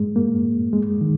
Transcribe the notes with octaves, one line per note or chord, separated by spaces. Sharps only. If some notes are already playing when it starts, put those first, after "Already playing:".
Already playing: G#3
A#3
G#3
D#3